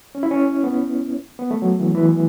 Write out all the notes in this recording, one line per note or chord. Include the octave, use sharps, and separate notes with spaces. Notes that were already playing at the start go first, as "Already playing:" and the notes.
C#4
E4
C#4
B3
B3
A3
F#3
E3
E3